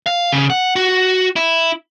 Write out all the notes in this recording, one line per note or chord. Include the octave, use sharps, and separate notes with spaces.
F5
C#3
F#5
F#4
E4